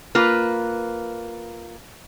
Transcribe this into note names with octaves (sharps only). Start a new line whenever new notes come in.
A#3 F4 B4